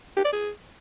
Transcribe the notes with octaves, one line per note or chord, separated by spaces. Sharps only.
G4
D5
G#4